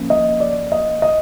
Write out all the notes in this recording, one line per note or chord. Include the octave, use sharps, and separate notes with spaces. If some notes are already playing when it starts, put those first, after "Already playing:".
Already playing: F3 A#3 C#4
D#5
D5
D#5
D#5